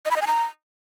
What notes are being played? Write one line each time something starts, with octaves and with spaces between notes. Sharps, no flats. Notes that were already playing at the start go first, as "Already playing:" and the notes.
D#5
B5
D#5
G#5
A#5